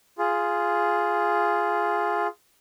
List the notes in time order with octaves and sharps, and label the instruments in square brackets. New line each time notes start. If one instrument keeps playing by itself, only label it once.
[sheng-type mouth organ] F4 G#4